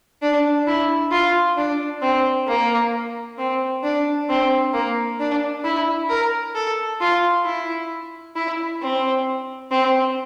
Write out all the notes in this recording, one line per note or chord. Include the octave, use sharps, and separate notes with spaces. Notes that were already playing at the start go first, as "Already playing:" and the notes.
D4
E4
F4
D4
C4
A#3
C4
D4
C4
A#3
D4
E4
A#4
A4
F4
E4
E4
C4
C4